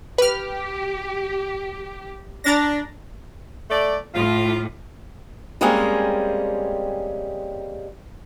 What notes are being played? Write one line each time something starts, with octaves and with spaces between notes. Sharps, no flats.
G4 B4 F6
D4 A#5 A6 A#6
A3 D5
A2 F4
G3 G#3 A#3 C4 C#4 G#4